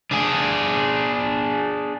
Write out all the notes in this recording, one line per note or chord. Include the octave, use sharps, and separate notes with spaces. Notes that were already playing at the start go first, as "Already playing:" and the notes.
D4 G#4